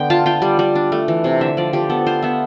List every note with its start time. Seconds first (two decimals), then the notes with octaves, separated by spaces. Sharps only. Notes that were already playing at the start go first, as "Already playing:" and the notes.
Already playing: D3 B3 G5
0.10 F4 A5
0.26 F4 G5
0.42 G3
0.59 G3
0.75 D4
0.92 A3
1.08 E3
1.24 C3
1.41 D3 E5
1.57 F3 D5
1.73 F3 G4
1.90 B3 A4
2.07 F4 C5
2.23 B3 E5